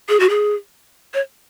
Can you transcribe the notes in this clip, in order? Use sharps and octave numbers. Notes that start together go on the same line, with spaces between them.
G#4
F#4
G#4
C#5